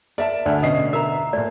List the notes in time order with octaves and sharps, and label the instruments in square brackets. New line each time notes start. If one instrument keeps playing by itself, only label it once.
[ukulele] A#4 E5 A5 [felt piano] D5
[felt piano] D2 A3 G#5 [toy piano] D5
[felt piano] B2 D3 C7 [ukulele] C#4 D#5
[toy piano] A#4 [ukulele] E5 A#5
[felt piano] A#2 A3 [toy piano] D5